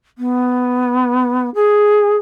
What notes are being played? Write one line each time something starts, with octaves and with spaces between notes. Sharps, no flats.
B3
G#4